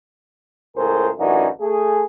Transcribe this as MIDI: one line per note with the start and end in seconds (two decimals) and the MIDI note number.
0.77 1.09 37
0.77 1.09 45
0.77 1.09 68
0.77 1.09 70
0.77 1.09 72
1.19 1.47 33
1.19 1.47 42
1.19 1.47 52
1.19 1.47 62
1.19 1.47 63
1.19 1.47 66
1.61 2.03 57
1.61 2.03 68